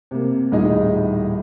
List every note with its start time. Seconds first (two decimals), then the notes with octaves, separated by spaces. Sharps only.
0.11 C3 A#3
0.52 D#1 A2 D#4 G#4